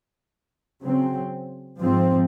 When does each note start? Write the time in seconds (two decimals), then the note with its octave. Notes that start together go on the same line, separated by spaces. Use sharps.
0.82 C#3 F#3 C4
1.80 G#2 F3 C4